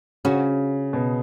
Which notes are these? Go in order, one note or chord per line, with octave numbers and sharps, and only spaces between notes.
C#3 C#4 F#4
B2